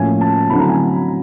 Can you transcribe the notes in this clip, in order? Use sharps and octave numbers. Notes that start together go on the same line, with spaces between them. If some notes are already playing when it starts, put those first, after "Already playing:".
Already playing: A2 F3 A#3 C#4 E4 G#5
A5
D3 F#3 A3 C4 E4 B5
A#5
G#5